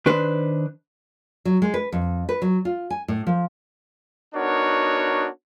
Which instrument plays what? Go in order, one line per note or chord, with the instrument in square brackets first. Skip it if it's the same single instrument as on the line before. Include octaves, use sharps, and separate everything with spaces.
[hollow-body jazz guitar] D#3 D4 B4 C5
[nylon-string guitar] F#3
G#3
B4
F2
B4
F#3
F4
G#5
A2
F3
[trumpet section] B3 D4 D#4 F#4 A#4 C#5